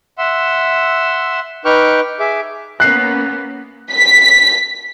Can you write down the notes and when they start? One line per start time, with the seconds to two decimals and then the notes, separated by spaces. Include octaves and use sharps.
0.18 E5 F#5 C6 E6
1.65 D#4 B4 G5 C#6 D6 F6
2.20 G#4 E5 D6
2.80 A#3 B3 C#4 F#6 C7
3.92 B6